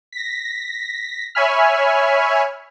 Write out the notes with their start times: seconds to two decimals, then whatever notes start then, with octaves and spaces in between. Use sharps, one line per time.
0.12 A#6 B6
1.35 C#5 E5 G#5 B5 F6